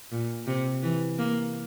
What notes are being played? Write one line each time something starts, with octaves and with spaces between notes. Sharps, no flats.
A#2
C3
E3
A#3